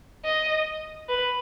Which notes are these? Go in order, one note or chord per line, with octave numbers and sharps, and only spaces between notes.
D#5
B4